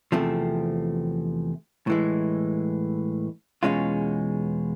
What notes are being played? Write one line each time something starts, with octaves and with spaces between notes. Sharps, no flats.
E2 C3 F3 A3 C4
A2 E3 G#3
E2 B2 G#3 C#4 F4